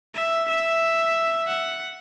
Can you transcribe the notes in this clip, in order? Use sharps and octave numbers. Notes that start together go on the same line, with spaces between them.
E5
E5
F#5